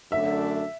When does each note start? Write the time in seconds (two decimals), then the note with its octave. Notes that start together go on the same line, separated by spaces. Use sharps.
0.11 F#2 D3 F#3 A3 D4 E5